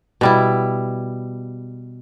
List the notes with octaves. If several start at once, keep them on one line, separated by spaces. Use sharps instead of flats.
B2 G3 E4